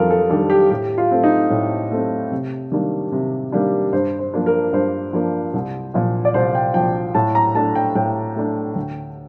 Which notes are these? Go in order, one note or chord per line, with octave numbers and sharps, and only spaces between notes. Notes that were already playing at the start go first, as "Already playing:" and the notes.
Already playing: F2 D#3 G3 F4 G4 A4 A#4
A4
D#3 G3 D4 A4
G4
A2 G4
F4
A3 C4
D#4
A2
A3 C4
C3
D#3 G3 A#3 D4
C3
D#3 G3 A#3 D4
G2 C5
C5
F3 A#3 D4
A#4
G2 C5
F3 A#3 D4
C2
A#2 F3
D5
C2 C5
G5
A#2 F3 G5
A2 A5
A#5
A3 D4 A5
G5
A2 G5
A3 D4
D2